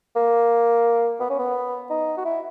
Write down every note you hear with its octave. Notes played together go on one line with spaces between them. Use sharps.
A#3
B3
C#4
B3
D#4
F#4
E4